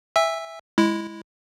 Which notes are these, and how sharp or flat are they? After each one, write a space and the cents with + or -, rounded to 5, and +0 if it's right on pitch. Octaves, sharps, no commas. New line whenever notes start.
E5 +0 G#5 -35 E6 +0
G#3 +0 E4 +0